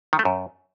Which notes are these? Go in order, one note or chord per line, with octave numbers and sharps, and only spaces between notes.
D#3
A3
F#2